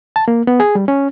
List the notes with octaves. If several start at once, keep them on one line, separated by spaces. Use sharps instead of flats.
A5
A#3
B3
G#4
G3
C#4